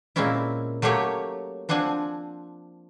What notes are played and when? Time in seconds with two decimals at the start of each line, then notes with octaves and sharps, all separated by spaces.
0.16 A#2 G#3 A#3 C4 C#4 E4
0.82 F#3 A3 A#3 G4 C#5
1.69 F3 C4 D4 F#5 G#5